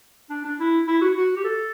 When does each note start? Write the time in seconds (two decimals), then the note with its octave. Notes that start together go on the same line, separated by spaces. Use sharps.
0.30 D4
0.45 D4
0.60 E4
0.88 E4
1.02 F#4
1.17 F#4
1.36 G4
1.44 A4